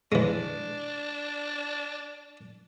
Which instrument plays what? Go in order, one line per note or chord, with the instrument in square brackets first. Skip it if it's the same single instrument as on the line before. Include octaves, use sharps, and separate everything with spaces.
[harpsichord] E3 G#3 [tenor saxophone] D4